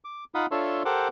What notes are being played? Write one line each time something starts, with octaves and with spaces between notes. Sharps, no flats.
D6
D#4 F4 F5 F#5 B5 D#6
D4 F4 A4 C#5 E5 C6
G4 A4 A#4 C5 F#5 D6